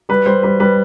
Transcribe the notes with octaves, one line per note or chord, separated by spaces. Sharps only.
G3 B4
G3 C5
G3 B4
G3 B4